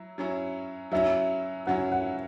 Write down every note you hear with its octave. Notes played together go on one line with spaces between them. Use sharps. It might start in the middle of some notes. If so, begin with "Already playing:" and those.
Already playing: F#3 E4
F#3 C#4 E4
F#3 C#4 E4 E5
F#3 C#4 E4 F#5
F#5